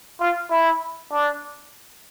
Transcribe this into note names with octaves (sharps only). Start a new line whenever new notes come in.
F4
E4
D4